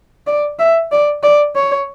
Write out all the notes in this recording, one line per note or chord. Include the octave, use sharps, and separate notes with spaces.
D5
E5
D5
D5
C#5